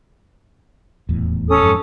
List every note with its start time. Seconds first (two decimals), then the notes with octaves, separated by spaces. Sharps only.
1.09 D#1 E2 A2
1.48 C#4 A4 D#6
1.63 F2 G#2